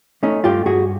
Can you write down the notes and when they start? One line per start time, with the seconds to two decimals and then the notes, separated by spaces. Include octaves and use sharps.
0.23 A3 C#4 D#4
0.44 G2 F4 G4
0.65 G2 F#4 G#4